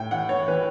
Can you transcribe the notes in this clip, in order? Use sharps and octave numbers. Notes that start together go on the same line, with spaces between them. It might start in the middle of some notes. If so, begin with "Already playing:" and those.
Already playing: A2 G5
E3 F#5
C#5
E3 B4